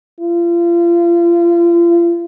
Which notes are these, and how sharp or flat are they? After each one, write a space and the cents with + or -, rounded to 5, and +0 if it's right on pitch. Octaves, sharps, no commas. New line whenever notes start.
F4 -35